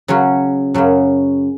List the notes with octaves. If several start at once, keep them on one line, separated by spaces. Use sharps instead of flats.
C#3 F#3 C#4 F#4
F#2 C#3 F#3